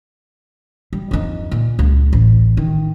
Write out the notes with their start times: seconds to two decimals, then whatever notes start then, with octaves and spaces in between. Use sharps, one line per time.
0.93 G3
1.11 F2 D#4
1.51 A#2
1.79 C#2
2.13 A1
2.57 D#3